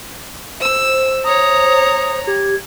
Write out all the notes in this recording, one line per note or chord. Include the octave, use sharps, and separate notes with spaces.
C5 E6
C#5 A#5 D#6
G4 G#6